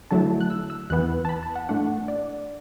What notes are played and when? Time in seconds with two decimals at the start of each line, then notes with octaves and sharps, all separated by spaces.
0.11 D3 F#3 A3 E4 A5
0.41 F#6
0.50 E6
0.70 E6
0.90 E2 E3 B3 F#6
1.25 A5
1.29 B5
1.43 A5
1.55 F#5
1.69 A2 A3 D4 F#5
2.08 D5